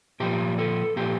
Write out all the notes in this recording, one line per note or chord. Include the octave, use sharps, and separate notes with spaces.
A#2 F3 G4
A4
A#2 F3 G4